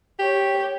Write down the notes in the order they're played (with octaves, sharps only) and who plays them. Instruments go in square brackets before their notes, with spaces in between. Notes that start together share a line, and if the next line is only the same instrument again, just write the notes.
[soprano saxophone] G4 [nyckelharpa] C#5